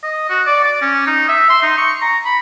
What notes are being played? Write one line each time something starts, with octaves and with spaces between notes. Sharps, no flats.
D#5
F#4
D5
D5
C#4
D#4
E5
C6
D#4
C#6
A#5
B5